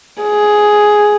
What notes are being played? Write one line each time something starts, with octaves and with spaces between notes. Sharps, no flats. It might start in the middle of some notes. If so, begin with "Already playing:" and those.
G#4